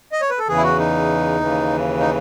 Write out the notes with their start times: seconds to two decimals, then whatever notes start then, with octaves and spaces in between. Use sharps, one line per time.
0.12 D#5
0.21 C#5
0.30 B4
0.39 A4
0.48 E2 C#3 E3 G#4
0.56 E4
0.63 F#4
0.78 D#4
1.41 D#2 C#3 E3
2.00 D#4